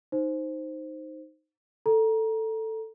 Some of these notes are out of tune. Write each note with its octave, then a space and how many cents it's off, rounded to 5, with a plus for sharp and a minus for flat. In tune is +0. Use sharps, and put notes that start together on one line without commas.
D#4 +0 C5 +0
A4 +10 A#5 +20